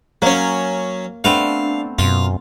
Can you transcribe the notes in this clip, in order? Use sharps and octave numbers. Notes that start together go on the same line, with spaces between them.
F#3 A#3 C#4
A3 B3 C4 D4 F5
F#2 B2 F4